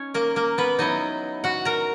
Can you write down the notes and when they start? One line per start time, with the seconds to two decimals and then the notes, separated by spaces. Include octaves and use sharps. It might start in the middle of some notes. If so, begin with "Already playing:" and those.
Already playing: C#4 D#4 C#5
0.14 A#3 A#4
0.36 A#3 A#4
0.58 B3 B4
0.79 F#3 B3 D#4 E4 D#5
1.44 F#4 F#5
1.65 A#4 A#5